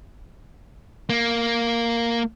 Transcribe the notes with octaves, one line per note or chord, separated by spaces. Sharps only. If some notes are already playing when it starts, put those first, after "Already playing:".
A#3